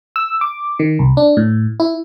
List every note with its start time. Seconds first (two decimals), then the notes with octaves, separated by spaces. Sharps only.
0.16 E6
0.41 D6
0.79 D#3
0.99 C2
1.17 D4
1.37 A2
1.80 E4